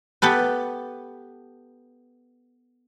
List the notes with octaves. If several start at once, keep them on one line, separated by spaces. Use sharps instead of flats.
B3 G4 A4 B4